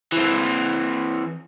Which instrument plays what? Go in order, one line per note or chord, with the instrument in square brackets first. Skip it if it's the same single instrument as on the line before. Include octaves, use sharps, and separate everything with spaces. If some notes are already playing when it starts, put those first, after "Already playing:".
[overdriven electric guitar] E3 C4